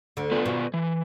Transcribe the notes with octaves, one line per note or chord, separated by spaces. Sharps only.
D2 D3
B3 F4 B4 D5
B2
E3